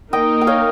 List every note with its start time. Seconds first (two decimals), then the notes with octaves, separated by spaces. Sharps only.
0.13 A#3 D#4 A#4 D#5 G5
0.41 G5
0.47 C#5 F5